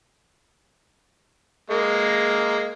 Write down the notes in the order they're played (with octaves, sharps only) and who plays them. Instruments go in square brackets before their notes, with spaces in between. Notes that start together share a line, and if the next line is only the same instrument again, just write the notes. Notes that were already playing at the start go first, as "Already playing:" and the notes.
[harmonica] G#3 A#3